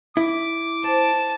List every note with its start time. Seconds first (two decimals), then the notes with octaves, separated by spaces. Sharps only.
0.17 E4 D6
0.83 C5 A5